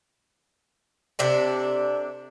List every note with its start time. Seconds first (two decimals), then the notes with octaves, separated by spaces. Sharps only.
1.19 C3 D4 A4